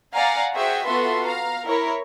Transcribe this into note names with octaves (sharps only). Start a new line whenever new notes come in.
D5 F5 F#5 G#5 A#5
F#4 G#4 C5 E5 G5
B3 F4 F#4 A4 E5 C6
F5 A#5
E4 A#4 C#5